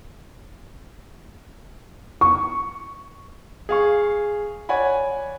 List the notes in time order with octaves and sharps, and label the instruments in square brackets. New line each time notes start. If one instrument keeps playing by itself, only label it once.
[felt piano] C#6
[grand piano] G#4 F5 C#6
C#5 D5 F#5 G#5 B5